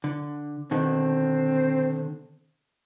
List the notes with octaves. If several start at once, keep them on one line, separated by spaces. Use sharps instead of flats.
D3
B2 D3 D#3 C4